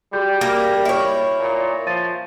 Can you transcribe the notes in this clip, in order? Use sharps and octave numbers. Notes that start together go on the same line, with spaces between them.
G3 F#4 G#4 G6
A#3
E4 C#5
A#2
F3 A6 D#7